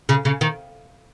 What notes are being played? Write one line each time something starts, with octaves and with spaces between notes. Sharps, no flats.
C#3
C#3
D#3